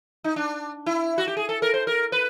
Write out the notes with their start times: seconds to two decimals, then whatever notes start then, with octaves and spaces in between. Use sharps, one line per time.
0.24 D#4
0.36 D4
0.86 E4
1.18 F#4
1.27 G4
1.37 G#4
1.49 A4
1.62 A#4
1.74 C5
1.87 A#4
2.12 B4